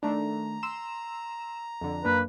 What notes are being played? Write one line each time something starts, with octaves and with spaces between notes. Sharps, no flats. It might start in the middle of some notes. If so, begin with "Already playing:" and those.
D#3 A3 D4 A#5
C6 E6 E7
F2 D3
F#2 A#3 D4 B4